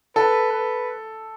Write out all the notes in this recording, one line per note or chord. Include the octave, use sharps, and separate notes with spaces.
A4 B4
B4